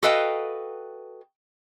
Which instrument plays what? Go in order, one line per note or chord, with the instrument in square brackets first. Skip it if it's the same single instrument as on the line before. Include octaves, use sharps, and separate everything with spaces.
[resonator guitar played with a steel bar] F#4 A4 B4 D#5 F5 G5